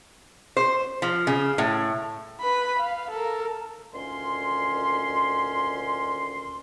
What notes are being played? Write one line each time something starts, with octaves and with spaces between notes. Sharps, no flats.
C5
F3
C#3
A2
B4 B5
F5
A4 A#4
D2 A#2 D#3 C#4 C6